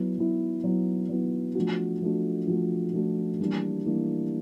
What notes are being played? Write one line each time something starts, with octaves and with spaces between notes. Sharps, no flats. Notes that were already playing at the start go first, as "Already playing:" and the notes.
Already playing: F#3 B3 E4
F#3 B3 E4
F#3 B3 E4
F#3 B3 E4
F3 A3 D4 F#4
F3 A3 D4 F#4
F3 A3 D4 F#4
F3 A3 D4 F#4
E3 G3 A#3 D4
E3 G3 A#3 D4